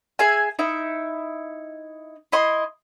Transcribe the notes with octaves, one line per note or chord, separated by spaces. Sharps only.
G#4 E5 G#5
D#4 E4 E5
E4 D#5 C6